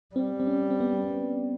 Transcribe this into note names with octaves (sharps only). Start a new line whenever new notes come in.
G3 C4
C4
C#4
C4
B3